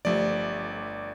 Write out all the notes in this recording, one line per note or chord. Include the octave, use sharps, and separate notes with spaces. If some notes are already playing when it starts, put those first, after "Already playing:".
G1 F3 A3 G4 D5